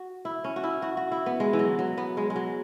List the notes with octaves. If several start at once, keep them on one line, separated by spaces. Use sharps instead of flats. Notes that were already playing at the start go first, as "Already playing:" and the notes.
Already playing: F#4
E4
C#4
F#4
E4
F#4
F#4
E4
B3
G#3
E3
F#3
F#3
B3
G#3
G#3
F#3